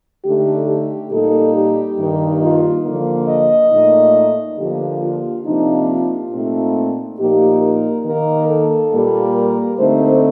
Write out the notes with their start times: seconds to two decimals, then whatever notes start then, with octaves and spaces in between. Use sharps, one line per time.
0.25 D3 A3 D#4 G4
0.68 G4
1.12 A#2 G3 A#3 D#4 A4
1.55 G4
1.98 G2 D#3 A#3 D#4
2.42 F4
2.85 D3 F3 A#3
3.28 D#5
3.71 A#2 A3 D#4
4.58 D3 F3 A#3 G4
5.01 F4
5.45 C3 F3 A#3 D4 D#4
5.89 F4
6.32 A#2 A3 C4 D#4
7.19 A#2 F3 A#3 D#4 G4
7.62 A#4
8.06 D#3 A#3 D#4 A#4
8.49 A4
8.93 A#2 G3 A#3
9.36 A#4
9.79 D3 A3 C4 D#4 C5